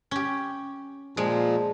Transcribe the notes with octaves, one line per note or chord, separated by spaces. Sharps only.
C#4 G4
A#2 F3 G#3